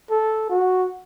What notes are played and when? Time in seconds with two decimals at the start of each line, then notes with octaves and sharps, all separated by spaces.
0.11 A4
0.50 F#4